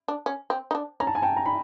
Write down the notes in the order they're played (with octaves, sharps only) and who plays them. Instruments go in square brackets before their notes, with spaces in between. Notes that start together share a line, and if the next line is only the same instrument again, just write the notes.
[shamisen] D4
C#4
C4
D#4
D4
[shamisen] C#4 [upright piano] A#5
[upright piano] A5
G#5
G5 A5
A#5
B5